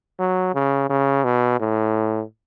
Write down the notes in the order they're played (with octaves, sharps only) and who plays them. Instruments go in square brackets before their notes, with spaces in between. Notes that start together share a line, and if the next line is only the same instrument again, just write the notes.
[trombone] F#3
C#3
C#3
B2
A2